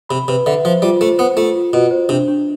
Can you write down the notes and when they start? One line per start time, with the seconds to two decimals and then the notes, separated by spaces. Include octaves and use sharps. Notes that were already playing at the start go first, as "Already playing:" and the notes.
0.09 C3 B5
0.28 C3 B4
0.46 D3 E5
0.65 F3 C5
0.82 G3 F4
1.01 A3 C5
1.18 B3 C5
1.36 A3 F4
1.56 F4
1.73 B2 F4
1.91 C5
2.09 C3 D4
2.28 D4